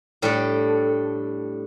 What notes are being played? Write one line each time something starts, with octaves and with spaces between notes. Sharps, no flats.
A2 G3 D4 A4